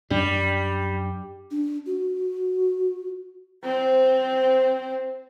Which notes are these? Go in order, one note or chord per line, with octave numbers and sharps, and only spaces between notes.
F#2 G3 D4
D4
F#4
C4 C5